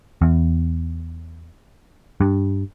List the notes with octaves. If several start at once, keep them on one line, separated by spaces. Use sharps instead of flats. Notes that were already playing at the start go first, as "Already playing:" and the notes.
E2
G2